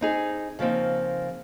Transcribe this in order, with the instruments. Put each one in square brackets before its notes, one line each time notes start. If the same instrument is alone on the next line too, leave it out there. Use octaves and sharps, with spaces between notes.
[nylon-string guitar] C4 D#4 G#4
C#3 F3 A#3 C4 D#4